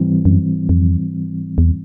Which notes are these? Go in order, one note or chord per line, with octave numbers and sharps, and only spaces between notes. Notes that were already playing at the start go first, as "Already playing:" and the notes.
Already playing: G#2 E3 G3 C4
F#2
F2
E2